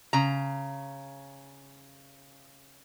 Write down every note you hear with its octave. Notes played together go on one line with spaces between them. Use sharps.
C#3 A#5